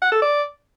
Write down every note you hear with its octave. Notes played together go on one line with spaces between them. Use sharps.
F#5
A4
D5